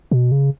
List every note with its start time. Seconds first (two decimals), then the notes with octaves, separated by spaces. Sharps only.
0.11 B2
0.32 C#3